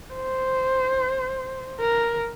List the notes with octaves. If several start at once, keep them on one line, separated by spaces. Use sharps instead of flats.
C5
A#4